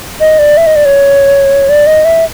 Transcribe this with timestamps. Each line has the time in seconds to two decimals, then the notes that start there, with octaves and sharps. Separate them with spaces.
0.20 D#5
0.39 D5
0.57 E5
0.66 D#5
0.76 D5
0.85 C#5
1.69 D5
1.87 D#5
2.05 E5